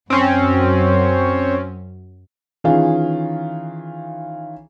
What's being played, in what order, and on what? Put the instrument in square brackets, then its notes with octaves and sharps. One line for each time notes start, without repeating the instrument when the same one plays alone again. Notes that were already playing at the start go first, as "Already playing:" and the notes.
[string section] F#2 [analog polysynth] C4 C#4
[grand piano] D#3 E3 C#4 F4 G#4